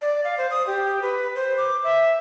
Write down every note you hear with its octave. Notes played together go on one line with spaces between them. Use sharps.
D5
F5
C5
D#6
G4
B4
C5
D6
E5